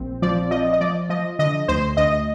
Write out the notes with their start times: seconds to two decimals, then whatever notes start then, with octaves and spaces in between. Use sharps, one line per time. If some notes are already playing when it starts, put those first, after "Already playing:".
Already playing: A#1 C4
0.22 F3 D5
0.51 F3 D#5
0.73 D#5
0.81 F3 D5
1.09 F3 D#5
1.39 D3 D#5
1.68 D2 C5
1.97 D2 D#5